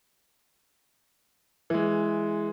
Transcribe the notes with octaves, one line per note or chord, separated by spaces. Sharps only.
E3 G#3